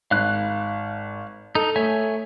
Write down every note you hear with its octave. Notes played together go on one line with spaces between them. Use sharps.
G#1 F5 F#6
D#4 A4
A3 C#5 E5 G#5